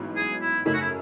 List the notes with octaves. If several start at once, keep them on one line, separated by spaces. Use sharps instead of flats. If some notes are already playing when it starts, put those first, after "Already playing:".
Already playing: A1 G#2 F#3 B3
G#4
E4
F#2 C#3 F#3 A3 D#4 E4
F#4
E4